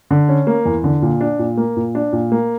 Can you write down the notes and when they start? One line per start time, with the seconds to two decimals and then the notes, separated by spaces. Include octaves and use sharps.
0.11 D3
0.29 C#4
0.47 A#3
0.65 E2
0.84 D3
1.02 A#2
1.21 D4
1.39 A#2
1.57 A#3
1.76 A#2
1.95 D4
2.12 A#2
2.32 A#3